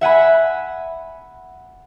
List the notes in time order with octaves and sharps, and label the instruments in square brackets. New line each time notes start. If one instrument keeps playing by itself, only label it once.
[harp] E5 F#5 G#5 B5